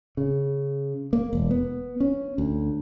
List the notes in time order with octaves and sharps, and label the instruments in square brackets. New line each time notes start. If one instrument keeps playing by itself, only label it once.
[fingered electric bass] C#3
A#3
E1
B3
C#4
D2